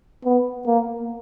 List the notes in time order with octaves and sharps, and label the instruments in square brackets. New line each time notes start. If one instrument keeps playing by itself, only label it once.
[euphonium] B3
A#3